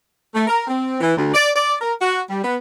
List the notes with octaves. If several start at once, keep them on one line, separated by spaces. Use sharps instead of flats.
A3
A#4
C4
E3
D2
D5
D5
A#4
F#4
G3
B3